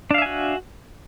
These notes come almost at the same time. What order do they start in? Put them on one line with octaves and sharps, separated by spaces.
D4 F5 E5 G#5 F#4